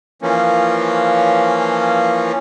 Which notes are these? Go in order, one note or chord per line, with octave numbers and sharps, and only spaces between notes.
E3 F3 A#3 C#4